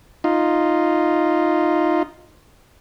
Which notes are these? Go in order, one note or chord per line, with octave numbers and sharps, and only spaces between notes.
D#4 F4